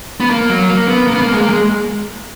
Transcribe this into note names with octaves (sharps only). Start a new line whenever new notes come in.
B3
A#3
F#3
A#3
B3
A#3
B3
A#3
G#3
A#3
G#3